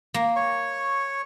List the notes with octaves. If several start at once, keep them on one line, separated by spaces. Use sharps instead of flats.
A#3
C#5 C#6